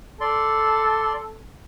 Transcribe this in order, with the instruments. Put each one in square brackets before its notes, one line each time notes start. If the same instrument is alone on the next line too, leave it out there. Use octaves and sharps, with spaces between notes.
[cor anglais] A4 [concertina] D5 C6